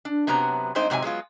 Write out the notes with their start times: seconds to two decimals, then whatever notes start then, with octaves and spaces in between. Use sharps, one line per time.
0.05 D4
0.27 F#2 C3 F#3 B3 A#5
0.75 G2 G#3 C4 D#4 C5
0.90 G#2 C3 F#3 G#5
1.02 F#3 G#3 B3 F4